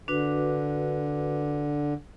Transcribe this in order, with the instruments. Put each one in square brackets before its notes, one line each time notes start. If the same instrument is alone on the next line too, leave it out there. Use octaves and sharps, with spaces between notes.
[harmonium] D3 [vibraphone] D4 F#4 B4